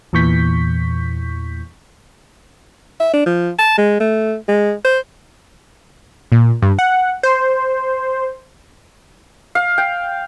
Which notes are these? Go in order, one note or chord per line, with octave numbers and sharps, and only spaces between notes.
E2 A#2 E3 C#6 G6 B6
E5
D4
F3
A5
G#3
A3
G#3
C5
A#2
G2
F#5
C5
F5
G5